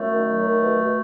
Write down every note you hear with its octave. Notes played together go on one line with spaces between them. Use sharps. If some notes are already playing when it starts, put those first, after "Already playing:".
Already playing: F#2 A3
D#3
F#3
D#3
B2
B2